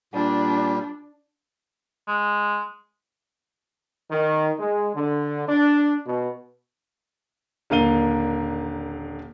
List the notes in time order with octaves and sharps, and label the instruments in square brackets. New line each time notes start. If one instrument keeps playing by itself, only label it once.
[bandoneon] A#2 G3 [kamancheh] D4
[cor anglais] G#3
[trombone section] D#3
G#3
D3
D4
B2
[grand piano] D#1 D3 A#4 F5 D#7 G7